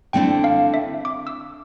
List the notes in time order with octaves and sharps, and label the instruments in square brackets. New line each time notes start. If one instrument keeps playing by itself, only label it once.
[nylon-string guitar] D3 A3 C4 E4 [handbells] G5
[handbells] F5
E5
D6
E6